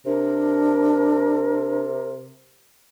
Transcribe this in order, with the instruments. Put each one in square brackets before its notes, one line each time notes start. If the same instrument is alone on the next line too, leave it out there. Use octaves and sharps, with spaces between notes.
[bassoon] C3 [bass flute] D4 [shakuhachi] A#4